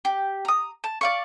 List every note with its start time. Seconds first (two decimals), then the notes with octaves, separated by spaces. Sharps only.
0.05 G4
0.45 A#5 D#6
0.84 A5
1.01 D5 F5 C#6